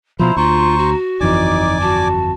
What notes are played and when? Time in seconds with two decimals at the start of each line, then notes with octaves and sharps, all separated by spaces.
0.19 B2 F3 E4 C5 A#5
0.37 D2 F4 C5 A#5 C#6
0.78 F#4
1.21 G1 F2 E3 D#4 D5 G#5 D6
1.81 F#4 A5